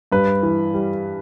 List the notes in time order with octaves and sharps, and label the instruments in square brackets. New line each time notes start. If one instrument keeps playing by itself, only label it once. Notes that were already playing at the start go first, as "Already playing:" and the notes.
[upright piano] G2 B4
E3
G3